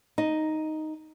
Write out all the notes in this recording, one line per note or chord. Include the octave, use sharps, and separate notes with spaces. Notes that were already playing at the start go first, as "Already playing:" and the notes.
D#4